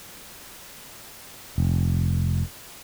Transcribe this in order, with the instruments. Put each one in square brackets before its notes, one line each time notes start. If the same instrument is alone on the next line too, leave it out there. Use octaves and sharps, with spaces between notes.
[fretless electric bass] F1